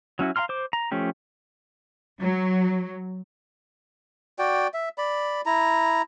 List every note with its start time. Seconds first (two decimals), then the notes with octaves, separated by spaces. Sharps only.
0.19 F#3 C#4 E4 F#4
0.36 F5 G5 A#5 C6 F6
0.49 C5 D6
0.73 A#5
0.92 F3 A3 C#4 G4
2.19 F#3
4.39 F#4 D5 G5
4.74 E5
4.98 D5 B5
5.46 E4 A#5